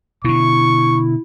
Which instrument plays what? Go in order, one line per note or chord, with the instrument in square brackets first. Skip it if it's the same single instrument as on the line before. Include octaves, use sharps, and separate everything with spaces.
[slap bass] B2 D3 [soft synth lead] E4 [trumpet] C#6